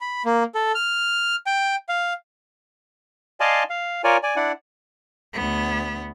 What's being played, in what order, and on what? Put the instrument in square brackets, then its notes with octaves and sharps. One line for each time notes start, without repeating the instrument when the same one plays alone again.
[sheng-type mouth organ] B5
A#3
A4
F6
G5
F5
[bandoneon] D5 D#5 F5 G#5 A5 C6
F5
F4 A#4 C#5 D5 G#5
D5 G#5
D4 E4 D5 F#5
[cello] D2 B3